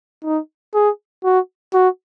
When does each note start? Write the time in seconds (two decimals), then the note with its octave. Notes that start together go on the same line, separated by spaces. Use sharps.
0.24 D#4
0.74 G#4
1.24 F#4
1.74 F#4